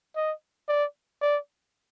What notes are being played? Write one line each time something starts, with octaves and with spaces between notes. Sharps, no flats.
D#5
D5
D5